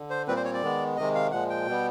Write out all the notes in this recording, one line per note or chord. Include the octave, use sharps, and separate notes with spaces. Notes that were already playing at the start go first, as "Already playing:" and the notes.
Already playing: D3
C5
A#2 G3 C4 B4
C5
C#5
D5
D#3 G#3 B3
C3 D#3 G#3 D#5
F5
A#2 F3 G#3 F#5
G5
B2 G3 B3